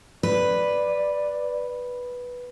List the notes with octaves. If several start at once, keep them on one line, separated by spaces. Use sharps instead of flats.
B4 D5